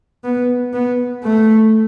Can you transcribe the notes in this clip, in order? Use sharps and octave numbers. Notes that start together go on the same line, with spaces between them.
B3
B3
A3